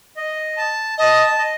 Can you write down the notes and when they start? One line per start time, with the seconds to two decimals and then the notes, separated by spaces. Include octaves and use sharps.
0.17 D#5
0.57 A5
0.98 D#5 A5
1.38 D#5